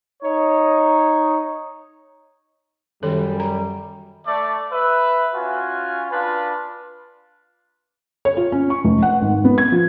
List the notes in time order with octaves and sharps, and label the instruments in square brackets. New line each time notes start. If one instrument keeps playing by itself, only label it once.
[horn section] D#4 C#5
[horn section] F#2 G3 [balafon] D#3 A4
[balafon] A#5
[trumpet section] A3 D5
B4 E5
C#4 F4 F#4 G#5
D4 F4 B4
[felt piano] C#5
F4
C#4
C#6
F1
F#5
G#1
B3
G#6
F3